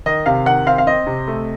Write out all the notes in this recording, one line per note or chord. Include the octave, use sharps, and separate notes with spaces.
D#3 D#5
C3 F5
D#3 F#5
C4 F5
F5
C4 D#5
C3
A3